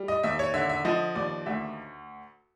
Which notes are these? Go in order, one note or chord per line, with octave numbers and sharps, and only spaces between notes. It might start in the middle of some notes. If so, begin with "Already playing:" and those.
Already playing: G3
D#5
D#2 E5
C#5
D3 E5
E5
F3 D#5
D#2 D5
D2 E5